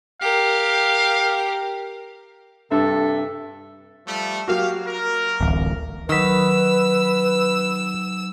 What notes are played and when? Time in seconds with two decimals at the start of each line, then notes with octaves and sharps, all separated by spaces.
0.21 G4 A#4 F5
2.72 G2 C3 A4 E5
4.07 F3 G3 A3
4.48 F#3 A#3 F#4 G4 F5
4.86 A#4
5.41 D1 A1
6.09 D#3 F#3 D#4 B4 E6